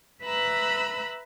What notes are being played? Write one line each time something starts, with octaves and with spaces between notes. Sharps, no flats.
B4 E5 A#5 B5 E6 F#6